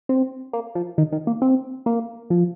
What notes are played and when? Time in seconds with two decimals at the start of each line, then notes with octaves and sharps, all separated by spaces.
0.09 C4
0.53 A#3
0.75 F3
0.98 D#3
1.12 D#3
1.27 A#3
1.42 C4
1.86 A#3
2.30 F3